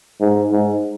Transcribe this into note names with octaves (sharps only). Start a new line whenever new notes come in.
G#2
G#2